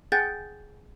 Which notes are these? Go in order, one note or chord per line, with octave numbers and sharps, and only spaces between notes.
G#4 F#5 G5 G6 A6